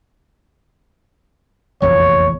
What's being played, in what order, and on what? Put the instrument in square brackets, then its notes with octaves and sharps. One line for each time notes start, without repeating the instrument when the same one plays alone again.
[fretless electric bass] F1 A#1 E2 [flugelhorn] C#5